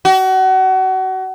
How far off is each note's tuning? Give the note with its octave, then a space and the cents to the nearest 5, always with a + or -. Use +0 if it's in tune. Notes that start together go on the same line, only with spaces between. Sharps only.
F#4 +30